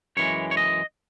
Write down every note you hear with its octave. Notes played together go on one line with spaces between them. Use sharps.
F#2 E3 G#3 C#5
C#5
D#5